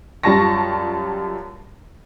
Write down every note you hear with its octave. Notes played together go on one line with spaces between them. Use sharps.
F#2 G3 F4 A5 C#6 A#6